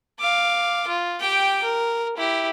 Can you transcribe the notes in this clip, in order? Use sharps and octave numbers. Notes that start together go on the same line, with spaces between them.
F5 D6
F4
G4 G5
A#4
E4 G4